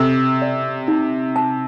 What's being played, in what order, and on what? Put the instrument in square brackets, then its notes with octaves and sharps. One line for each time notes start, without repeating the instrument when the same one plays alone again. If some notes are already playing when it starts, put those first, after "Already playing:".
Already playing: [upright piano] C3 [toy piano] A4
[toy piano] D5
D#4
A5